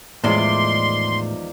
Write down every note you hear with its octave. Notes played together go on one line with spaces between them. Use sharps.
E2 A2 D#3 F3 G#3 D5 C6